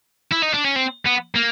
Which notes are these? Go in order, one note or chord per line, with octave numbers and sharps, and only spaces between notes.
E4
D#4
D4
C#4
C4
B3
A#3